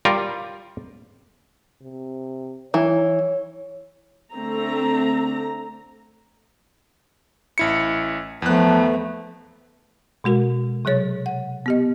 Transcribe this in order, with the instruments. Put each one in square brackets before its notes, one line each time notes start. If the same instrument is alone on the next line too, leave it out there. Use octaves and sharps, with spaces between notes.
[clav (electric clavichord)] G3 F4 A#4
[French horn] C3
[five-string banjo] E3 [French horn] C#5
[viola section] D3 A3 C4 A#5
[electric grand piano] A1 E4 C#7
[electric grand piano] E2 F#6 [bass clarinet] F3 [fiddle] A3 B3
[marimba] B2 G#3 F#4 A#4
C3 F#3 G#4 C#5 A6
F#5
B3 G4 D#5